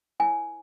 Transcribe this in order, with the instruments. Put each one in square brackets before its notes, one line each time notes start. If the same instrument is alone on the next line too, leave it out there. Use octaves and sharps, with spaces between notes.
[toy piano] E4 A#4 C#5 G#5